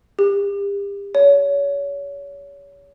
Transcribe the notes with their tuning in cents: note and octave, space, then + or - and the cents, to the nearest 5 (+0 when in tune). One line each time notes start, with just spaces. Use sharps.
G4 +35
C#5 +30